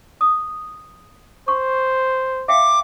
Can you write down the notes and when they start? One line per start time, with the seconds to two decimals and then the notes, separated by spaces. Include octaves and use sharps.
0.21 D#6
1.48 C5 C#6
2.48 E5 F5 G5 D6